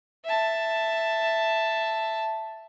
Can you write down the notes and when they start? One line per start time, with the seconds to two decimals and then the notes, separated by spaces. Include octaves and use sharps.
0.25 E5 A5